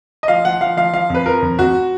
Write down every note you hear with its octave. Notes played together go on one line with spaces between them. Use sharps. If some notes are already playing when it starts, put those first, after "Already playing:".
D#5
F3 F5
F3 F#5
F3 F5
F3 F5
F3 F5
F2 B4
F3 A#4
F2
F2 F#4